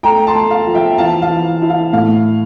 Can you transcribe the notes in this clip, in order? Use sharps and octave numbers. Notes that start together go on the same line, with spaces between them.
A3 G5 A#5
A5 C6
A3
F5
F3
E5 G5
E3 F5 A5
F5
E3
E4
F5
A2 F5